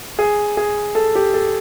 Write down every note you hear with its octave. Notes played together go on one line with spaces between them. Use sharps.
G#4
G#4
A4
G4
A4